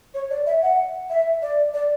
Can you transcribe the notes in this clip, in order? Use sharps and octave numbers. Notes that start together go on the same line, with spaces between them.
C#5
D5
E5
F#5
E5
D5
D5